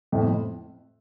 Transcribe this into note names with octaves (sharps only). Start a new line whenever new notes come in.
F2 A2
F2